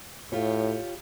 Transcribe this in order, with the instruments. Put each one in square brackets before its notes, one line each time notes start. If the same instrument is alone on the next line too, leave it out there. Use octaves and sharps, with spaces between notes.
[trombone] A2 [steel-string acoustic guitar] F4 G4 C#5